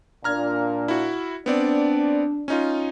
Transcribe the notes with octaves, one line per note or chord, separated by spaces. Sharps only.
A#2 D4 A#5 F6 G#6
E4 F#4
B3 C4 D4 D5
C#4 D#4 F4